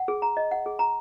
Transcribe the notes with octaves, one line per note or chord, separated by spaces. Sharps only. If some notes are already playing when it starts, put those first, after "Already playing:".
Already playing: F#5
G#4
A#5
D#5
F#5
G#4
A#5